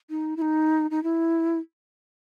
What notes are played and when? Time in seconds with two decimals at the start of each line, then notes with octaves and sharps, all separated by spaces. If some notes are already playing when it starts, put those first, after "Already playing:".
0.10 D#4
0.37 E4
0.42 D#4
0.91 D#4
1.03 E4